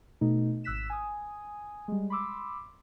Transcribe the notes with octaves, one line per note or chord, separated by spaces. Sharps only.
B2 A3 D#4
G#1 E6 F#6 B6 E7
G#5 D#6
G3 G#3
B5 C6 D6 E6